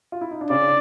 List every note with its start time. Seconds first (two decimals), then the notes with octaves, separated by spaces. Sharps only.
0.12 F4
0.21 E4
0.31 D#4
0.41 D4
0.50 C#3 C#4 D5